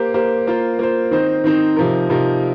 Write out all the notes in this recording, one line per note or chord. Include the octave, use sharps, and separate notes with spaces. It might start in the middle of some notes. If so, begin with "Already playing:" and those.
Already playing: A#3 G4 C5
A#3 G4 C5
A#3 F4 C5
A#3 F4 C5
D#3 C4 D#4 C5
D#3 C4 D#4 C5
C3 F3 D#4 A#4
C3 F3 D#4 A#4